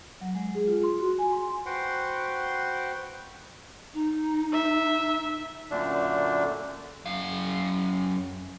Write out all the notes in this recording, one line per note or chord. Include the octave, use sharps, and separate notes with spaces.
F#3
G#3
G#4
F4
C6
F#4
G#5
C6
F#4 B4 C5 F#5 G5 C6
D#4
E5
F#2 A#2 D3 A3 D4
F#2 F5